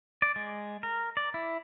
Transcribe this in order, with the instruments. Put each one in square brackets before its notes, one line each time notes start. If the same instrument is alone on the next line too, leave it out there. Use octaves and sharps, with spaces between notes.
[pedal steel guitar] D5
G#3
A#4
D5
E4